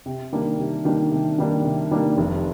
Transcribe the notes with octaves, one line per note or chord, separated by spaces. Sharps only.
C3
D#3 G3 A#3 D4
C3
D#3 G3 A#3 D4
C3
D#3 G3 A#3 D4
C3
D#3 G3 A#3 D4
F1